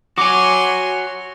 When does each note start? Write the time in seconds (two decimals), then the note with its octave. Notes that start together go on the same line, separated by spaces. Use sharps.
0.18 F#4 C#5 G#5 C6 D6